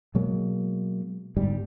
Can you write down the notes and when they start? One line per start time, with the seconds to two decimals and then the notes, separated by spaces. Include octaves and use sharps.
0.15 B2 F#3 G#3 A#3
1.37 G1 G#2 G3